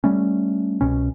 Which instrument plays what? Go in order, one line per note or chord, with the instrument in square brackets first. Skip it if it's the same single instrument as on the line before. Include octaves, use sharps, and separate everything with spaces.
[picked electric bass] G3 A3 C#4
C2 B2 C#4